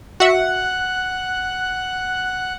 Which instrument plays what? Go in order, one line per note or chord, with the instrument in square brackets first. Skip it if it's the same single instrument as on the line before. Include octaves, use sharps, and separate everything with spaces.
[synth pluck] F#4 E5 [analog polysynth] F#5